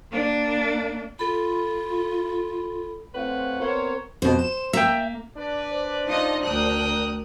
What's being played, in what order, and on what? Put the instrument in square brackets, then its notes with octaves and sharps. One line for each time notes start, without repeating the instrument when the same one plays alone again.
[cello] A#3 D4
[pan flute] F4 [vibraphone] A4 B5
[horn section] A3 C4 F4 B4 C#5 F#5
B3 C4 A#4 C5 C#5
[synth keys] F2 B2 [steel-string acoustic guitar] C5
[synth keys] E7
[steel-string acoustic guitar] A#3 [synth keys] E5 G5
[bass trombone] D4 [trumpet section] B4 D5
[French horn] C5
[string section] D#4 F4 D#5
[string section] D2 A#4 F#6 [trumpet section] G5 D#6